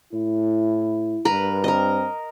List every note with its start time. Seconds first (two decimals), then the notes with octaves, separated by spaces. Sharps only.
0.13 A2 E4
1.25 G2 A#4 B4
1.64 C4 A#4 D#5